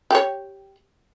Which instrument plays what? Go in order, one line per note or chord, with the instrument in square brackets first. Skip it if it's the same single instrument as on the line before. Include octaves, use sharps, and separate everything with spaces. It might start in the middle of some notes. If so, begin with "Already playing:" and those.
[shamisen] G4 C#5